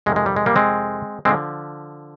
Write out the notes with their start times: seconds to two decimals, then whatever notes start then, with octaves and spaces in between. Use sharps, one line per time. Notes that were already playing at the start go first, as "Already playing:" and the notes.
0.06 F2 C3 D#3 G#3
0.16 G#3
0.26 G3
0.36 G#3
0.46 G3 A#3
0.56 G#3 C4
1.25 D3 F3 G#3 C4